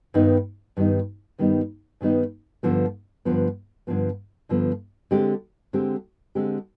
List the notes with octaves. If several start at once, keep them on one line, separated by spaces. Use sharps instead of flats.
G2 D#3 G3 B3 D#4
G2 D#3 G3 B3 D#4
G2 D#3 G3 B3 D#4
G2 D#3 G3 B3 D#4
G2 D3 F3 B3
G2 D3 F3 B3
G2 D3 F3 B3
G2 D3 F3 B3
D3 G#3 C4 G4
D3 G#3 C4 G4
D3 G#3 C4 G4